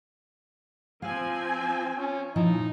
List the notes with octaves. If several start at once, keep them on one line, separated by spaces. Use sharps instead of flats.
F3 C4 F5 G#5
C#4
A#2 F3 D#4 E4